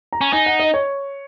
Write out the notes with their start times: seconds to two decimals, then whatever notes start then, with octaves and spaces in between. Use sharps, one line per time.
0.13 A#5
0.21 C#4
0.33 D#4 G#5
0.46 F#5
0.60 D#5
0.74 C#5